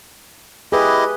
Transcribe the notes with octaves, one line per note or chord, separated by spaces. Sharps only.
E4 G4 G#4 B4 D#5